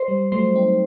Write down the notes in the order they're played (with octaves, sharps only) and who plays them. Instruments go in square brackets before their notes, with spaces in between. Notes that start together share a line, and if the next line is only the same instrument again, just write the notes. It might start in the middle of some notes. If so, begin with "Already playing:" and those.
Already playing: [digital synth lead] C5
[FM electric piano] G3
[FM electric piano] F#3 A3 [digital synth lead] C5
[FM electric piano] C4 D#4